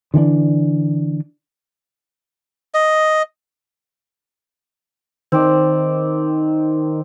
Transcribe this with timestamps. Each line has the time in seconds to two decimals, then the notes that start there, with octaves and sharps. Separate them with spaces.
0.14 D3 E3 G3 D4
2.74 D#5
5.32 D#3 C4 D5